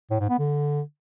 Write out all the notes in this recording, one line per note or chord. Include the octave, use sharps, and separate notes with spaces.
A2
G#2
B3
D3